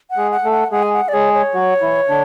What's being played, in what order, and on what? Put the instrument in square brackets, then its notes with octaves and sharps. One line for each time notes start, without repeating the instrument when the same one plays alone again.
[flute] F#5
[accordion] G#3 G#4
[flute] F#5
[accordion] A3 A4
[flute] F#5
[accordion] G#3 G#4 [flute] F#5
[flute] G#5
F#5
D5
[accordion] G#3 G#4 [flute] C#5
[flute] C#5
[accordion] F#3 F#4
E3 E4
D3 D4